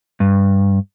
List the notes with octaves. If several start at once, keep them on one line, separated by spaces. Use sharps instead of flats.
G2